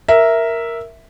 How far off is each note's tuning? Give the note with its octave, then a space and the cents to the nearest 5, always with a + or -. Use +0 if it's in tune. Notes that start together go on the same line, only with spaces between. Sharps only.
A#4 +0 E5 +0